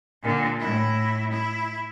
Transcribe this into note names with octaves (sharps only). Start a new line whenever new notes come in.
A#2 D3
A2 E4
E4